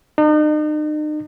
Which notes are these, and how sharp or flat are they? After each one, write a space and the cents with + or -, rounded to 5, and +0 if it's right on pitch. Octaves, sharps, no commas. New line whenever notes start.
D#4 -40